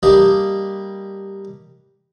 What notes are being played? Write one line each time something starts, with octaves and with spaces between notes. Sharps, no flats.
G3 A#3 D4 G4 D#5